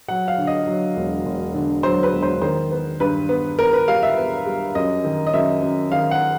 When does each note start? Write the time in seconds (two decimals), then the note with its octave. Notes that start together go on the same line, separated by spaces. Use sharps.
0.08 F#3 F#5
0.28 F5
0.38 D3
0.47 D#5
0.67 F#3
0.96 E1
1.25 E1
1.54 D3
1.83 F#3 C5
2.03 B4
2.13 E1
2.23 C5
2.42 D#3 C5
2.71 B3
3.00 G2 B4
3.29 B3
3.58 B3 A#4
3.73 B4
3.87 G3 F5
4.03 E5
4.17 B3
4.46 G3
4.75 F#2 D#5
5.04 D#3
5.27 D#5
5.34 F#2 E5
5.62 F#2
5.92 D#3 F5
6.11 F#5